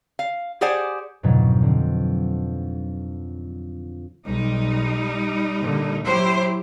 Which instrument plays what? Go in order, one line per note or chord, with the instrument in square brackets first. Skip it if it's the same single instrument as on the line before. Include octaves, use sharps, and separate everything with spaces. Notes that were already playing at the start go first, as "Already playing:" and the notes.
[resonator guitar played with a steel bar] F5
G4 G#4 C5 D5 F#5 G#5
[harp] F2 G#2 B2 D3 F3 F#3
D3 C4
[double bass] B1 [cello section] G3 D#4
[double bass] A#2 D3
[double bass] F#3 [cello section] E4 G4 C5